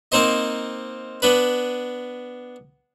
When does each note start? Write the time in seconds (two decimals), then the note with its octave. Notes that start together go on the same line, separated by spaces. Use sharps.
0.12 A#3 C4 D#4 C5 D#5
1.22 B3 D4 B4